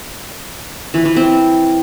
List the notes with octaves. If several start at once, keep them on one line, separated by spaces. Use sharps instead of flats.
E3
E3
C4